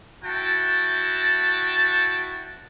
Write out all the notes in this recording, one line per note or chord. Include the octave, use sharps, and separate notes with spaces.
E4 F#4 G5 A5